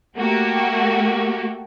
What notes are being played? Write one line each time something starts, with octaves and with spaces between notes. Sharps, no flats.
A3 A#3 F#4 G4